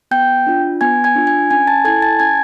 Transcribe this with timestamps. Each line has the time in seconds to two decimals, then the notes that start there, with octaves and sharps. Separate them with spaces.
0.11 B3 G5 G6
0.47 D4 F4
0.81 B3 G#5 G#6
1.04 G#5 G#6
1.16 D4 F4
1.27 G#5 G#6
1.50 C#4 G#5 G#6
1.68 A5 A6
1.84 E4 A4 G#5 G#6
2.02 A5 A6
2.19 C#4 G#5 G#6